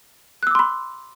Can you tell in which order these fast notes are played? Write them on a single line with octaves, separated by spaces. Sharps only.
F#6 E6 D6 C6 B5